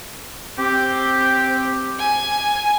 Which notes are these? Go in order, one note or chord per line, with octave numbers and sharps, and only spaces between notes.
C4 G4
G#5